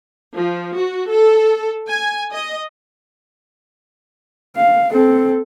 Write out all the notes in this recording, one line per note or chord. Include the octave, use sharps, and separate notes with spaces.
F3
F#4
A4
G#5
D#5
F5
C4 A4